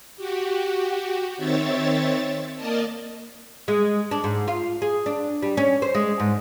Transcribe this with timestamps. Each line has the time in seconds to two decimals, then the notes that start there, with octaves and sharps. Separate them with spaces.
0.17 F#4 G4
1.37 D#3 C4 C#5 E5 A6
2.55 A#3 A#4 D5 D#5 A5
3.68 G#3
4.11 D4
4.24 G#2
4.48 F4
4.82 G#4
5.06 D4
5.42 G3
5.57 C#4
5.82 C5
5.95 G#3
6.20 G#2